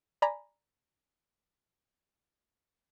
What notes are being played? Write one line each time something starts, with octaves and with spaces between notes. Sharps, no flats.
D5 G#5 A#5 B5